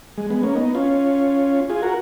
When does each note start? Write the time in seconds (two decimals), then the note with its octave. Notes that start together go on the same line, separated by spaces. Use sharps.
0.18 G#3
0.30 G#3 B3
0.43 A#3 C#4
0.55 B3 D#4
0.75 C#4 F4
1.70 F4 G#4
1.82 F#4 A#4